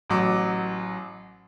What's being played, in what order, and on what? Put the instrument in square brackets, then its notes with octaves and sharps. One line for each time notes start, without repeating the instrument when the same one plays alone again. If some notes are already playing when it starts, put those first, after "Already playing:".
[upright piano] A1 F#3 D6